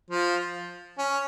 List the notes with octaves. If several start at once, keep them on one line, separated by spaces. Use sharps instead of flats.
F3 F4
C#4